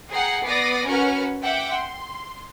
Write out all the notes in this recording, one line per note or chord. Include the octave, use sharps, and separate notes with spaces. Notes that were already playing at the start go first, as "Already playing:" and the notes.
G#4 F#5 G5 A#5 C7
B3 D5 D6 D#6 A#6 C7
C#4 F#4 A#4 B4 F#5 F6
E5 F#5 G5 D6
C6